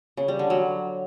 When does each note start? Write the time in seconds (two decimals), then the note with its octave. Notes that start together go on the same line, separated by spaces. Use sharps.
0.17 C#3
0.28 G3
0.39 D3
0.50 F#3